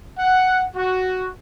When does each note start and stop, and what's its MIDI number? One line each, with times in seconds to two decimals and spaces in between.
0.19 0.64 78
0.77 1.28 66